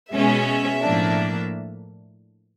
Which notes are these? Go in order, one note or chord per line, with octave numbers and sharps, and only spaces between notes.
B2 G#3 C#4 E5
A2 F3 A#3 D4